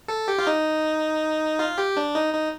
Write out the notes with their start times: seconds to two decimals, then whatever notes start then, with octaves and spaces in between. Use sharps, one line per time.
0.08 A4
0.28 G4
0.39 F4
0.47 D#4
1.59 F4
1.78 G4
1.97 D4
2.15 D#4
2.33 D#4